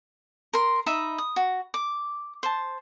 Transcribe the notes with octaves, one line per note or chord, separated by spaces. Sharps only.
A#4 C6
D#4 E5 B5
D#6
F#4
D6
C5 A5